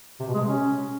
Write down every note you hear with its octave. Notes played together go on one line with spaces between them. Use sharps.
C3
B2
G#3
C3
C#4